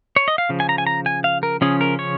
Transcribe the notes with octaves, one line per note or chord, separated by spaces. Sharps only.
C#5
D#5
F5
C#3 F3
G#5
A#5
G#5
A#5
G#5
F5
A#4
C#3 F3 C#4 G#4
A#4
C#5